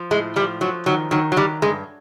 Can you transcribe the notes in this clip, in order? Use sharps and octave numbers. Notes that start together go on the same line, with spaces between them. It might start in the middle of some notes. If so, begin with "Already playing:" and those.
Already playing: F3
A2 G#3
F3 G3
F3 F#3
D#3 F#3
D#3 F#3
F#3
D#3 G3
G2 G#3